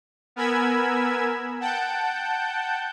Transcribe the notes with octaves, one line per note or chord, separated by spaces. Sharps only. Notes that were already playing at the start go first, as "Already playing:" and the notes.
B3 A#4 G#5 B5 E6 G#6
F#5 G5 A5 G6